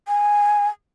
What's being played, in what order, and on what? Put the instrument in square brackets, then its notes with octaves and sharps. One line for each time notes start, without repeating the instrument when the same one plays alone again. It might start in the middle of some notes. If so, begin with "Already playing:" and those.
[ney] G#5